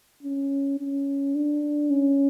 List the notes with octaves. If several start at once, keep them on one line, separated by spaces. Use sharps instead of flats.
C#4
C#4
D4
C#4